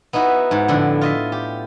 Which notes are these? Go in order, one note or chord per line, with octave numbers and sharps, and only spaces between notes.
B3 D#4 E4 F#4
G#2
F2 A2 D3
F4 D#5 E5
G4